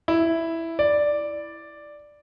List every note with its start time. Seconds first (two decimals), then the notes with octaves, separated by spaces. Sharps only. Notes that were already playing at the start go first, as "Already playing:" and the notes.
0.08 E4
0.79 D5